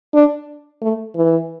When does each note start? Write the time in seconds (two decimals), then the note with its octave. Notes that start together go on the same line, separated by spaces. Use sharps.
0.14 D4
0.82 A3
1.15 E3